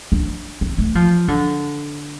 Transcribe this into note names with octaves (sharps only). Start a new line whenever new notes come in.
D4
C4
A3
F3
D3